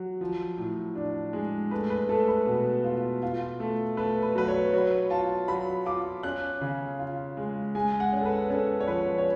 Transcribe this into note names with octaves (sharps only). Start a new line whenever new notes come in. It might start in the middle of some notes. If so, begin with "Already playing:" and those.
Already playing: F#3
F3
A2
D4
G#3
A3 B4
B4
A3 A4
B4
B2
F4
F4
A3
A3 B4
B4
F#3 B4
C#5
F#3 C#5
F4 A5
F#3 B5
F4 D6
C#4 F#6
C#3
F4
G#3
G#3 G#5
F#5
C#4
A4
B4
C#4 A4
C#5
F3 B4
C#5